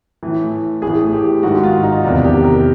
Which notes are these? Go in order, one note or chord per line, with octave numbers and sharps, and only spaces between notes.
A2 E3
A2 E3 G#4
G4
G#2 D#3 F#4
F4
D#4
E2 C3 D#3 D4
G4
A#4